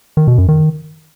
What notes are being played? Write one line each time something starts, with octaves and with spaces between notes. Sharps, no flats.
D#3
B2
F#2
D#3